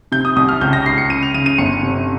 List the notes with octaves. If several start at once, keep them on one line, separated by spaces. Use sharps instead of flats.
C3 G6
D#6
C2 D#6
F6
C#2 G6
A#6
C#2 C7
C#7
C#3 D#7
F7
C#3 D#7
D#7
G1 C#7
C3